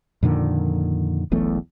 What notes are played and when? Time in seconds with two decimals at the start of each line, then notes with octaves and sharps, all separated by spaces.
0.23 F2 A#2 D3 D#3
1.31 E1 B1 E2 A3